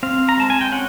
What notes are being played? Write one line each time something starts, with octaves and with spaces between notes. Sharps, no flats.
C4 F5
A#5
G#3 A5
G#5
G5
C#4 F#5